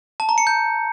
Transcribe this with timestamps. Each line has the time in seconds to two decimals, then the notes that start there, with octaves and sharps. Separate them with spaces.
0.20 A5
0.29 A#5
0.38 C#7
0.47 G6